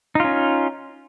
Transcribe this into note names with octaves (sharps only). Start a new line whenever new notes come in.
C#4 D#4 F4